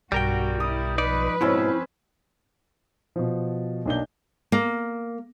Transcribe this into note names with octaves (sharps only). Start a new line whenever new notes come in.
B1 G2 G3 F#4 A#4 G5
E4 D#6
F3 D#4 B4 D5
G#2 B2 C4 C#4 E4 C5
B2 F3
B1 A#3 D4 D#5 G6 G7
A#3